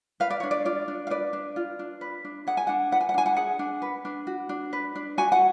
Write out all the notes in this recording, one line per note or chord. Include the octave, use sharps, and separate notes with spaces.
B4 F5
D5
D4 C#5
D5
F4 D5
D4
F5
B4 D5
D4
F4
D4
B4
D4
G#4 F#5
G#5
D4 F#5
B4 F#5
G#5
F#5
D4 G#5
F#5
G#4 F#5
D4
B4
D4
F#4
D4
B4
D4
F#4 G#5
F#5